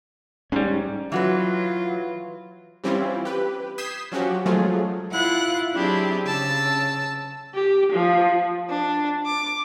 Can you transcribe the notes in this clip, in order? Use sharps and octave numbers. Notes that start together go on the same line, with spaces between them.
G#2 G3 C#4
E3 F#3 F4 F#4 B4
E3 G3 C4 C#4 E4 F4
G4 B4
D#6 G6 G#6 B6 C7 E7
F3 F#3 C#4 F#4 G4
F3 F#3 G#3 A3 F4 G#4
E4 F4 F#5 F#6
F#3 C4 D4 E4 G4 G#4
C#3 A5 E6
G4
F3
D4
D6